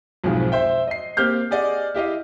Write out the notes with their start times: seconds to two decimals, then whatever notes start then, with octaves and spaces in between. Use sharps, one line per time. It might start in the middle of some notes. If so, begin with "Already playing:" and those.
0.24 B1 F2 G#2 F3 G#4
0.52 C5 E5 G5
0.87 D#5 C7
1.17 A#3 C4 G4 F6 G6
1.51 G4 G#4 D5 D#5 F#5
1.94 E4 G4 D#5 F5